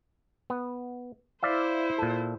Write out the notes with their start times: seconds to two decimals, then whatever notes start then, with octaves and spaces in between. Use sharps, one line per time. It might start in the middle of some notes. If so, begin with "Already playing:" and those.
0.50 B3
1.43 E4 C5 D5 E5 F5
1.98 A#2 A4